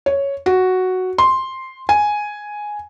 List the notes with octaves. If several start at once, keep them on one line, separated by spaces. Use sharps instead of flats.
C#5
F#4
C6
G#5